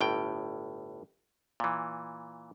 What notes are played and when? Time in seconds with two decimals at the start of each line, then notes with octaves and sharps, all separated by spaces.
0.01 G1 A2 G5
1.60 A#2 E3